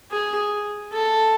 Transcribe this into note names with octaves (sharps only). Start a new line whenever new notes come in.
G#4
A4